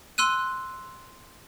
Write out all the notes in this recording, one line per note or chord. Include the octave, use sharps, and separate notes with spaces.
C6 E6 F#6 D#7